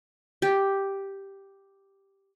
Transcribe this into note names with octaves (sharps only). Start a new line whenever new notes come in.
G4